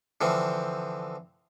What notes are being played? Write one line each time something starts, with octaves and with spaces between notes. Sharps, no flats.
D3 E3 F3 C4